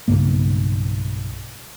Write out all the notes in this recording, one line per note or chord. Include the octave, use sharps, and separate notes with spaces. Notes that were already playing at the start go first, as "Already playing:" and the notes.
B1 G2 C#3 A#3